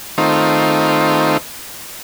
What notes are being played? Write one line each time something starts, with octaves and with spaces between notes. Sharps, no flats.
D#3 A3 C4 D#4 F4